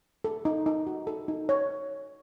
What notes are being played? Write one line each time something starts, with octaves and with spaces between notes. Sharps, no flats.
A4
D#4
D#4
F#4
A4
D#4
C#5